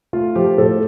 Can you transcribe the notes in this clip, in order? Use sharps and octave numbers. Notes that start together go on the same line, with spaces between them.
A3 F4
F3 G4
A2 A4